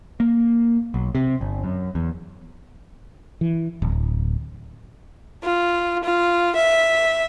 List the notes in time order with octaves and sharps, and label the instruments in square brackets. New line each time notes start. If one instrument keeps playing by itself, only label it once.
[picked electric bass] A#3
B1
C3
G1
F#2
E2
[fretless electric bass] E3
D1
[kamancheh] F4
F4
E5